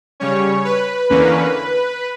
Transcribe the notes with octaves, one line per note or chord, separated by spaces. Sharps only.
C#3 G3 C#4 C#5
B4
E2 D3 A#3 C#4